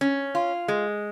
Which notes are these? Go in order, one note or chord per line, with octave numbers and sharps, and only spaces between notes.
C#4
F4
G#3